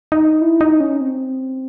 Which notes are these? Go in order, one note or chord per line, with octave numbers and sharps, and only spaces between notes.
D#4
E4
D#4
C#4
C4